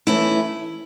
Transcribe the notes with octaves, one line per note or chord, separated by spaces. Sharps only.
E3 A3 C#4 E4